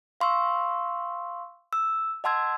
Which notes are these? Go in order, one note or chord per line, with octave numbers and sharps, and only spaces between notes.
F5 C6 C#6 E6
E6
D#5 F#5 A5 C6 E6 G#6